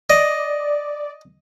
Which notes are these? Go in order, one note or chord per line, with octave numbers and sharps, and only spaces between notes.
D5 D#5